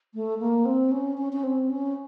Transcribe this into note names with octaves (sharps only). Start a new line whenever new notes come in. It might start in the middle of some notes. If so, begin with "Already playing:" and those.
A3
A#3
C4
C#4
C#4
C#4
C4
C#4